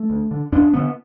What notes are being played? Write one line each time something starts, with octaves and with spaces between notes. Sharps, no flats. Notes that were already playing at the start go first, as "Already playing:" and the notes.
Already playing: A3
D2
D3
E2 D4
D3 B3